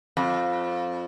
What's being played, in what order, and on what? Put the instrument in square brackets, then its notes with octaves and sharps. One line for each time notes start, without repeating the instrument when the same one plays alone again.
[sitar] F2